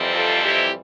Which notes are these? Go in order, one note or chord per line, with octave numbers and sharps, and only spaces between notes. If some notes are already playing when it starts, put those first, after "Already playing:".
Already playing: F2 C3 E3 G3 C4
F4 A4
E4 G4